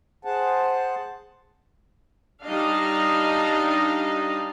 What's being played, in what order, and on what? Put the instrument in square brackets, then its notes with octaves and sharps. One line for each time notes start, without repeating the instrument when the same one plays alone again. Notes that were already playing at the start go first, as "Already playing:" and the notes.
[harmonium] G#4 C5 F#5 A5
[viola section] G3 D4 D#4 D#5 F5